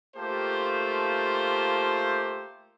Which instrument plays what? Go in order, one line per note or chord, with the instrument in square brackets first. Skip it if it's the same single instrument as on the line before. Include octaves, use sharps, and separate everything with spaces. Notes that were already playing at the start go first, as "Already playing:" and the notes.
[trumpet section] A3 A#3 F4 G4 C5 A5